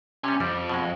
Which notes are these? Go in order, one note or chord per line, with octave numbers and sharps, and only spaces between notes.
C3 G3 C#4 G#5
F2 G3
B2 G#3